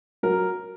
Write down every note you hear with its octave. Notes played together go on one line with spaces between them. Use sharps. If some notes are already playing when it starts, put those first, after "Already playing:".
F#3 A#4